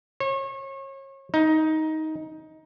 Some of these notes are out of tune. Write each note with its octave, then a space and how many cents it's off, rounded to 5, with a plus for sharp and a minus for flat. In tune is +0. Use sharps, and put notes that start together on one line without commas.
C#5 -35
D#4 +15